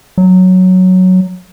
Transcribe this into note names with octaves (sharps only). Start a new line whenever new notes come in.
F#3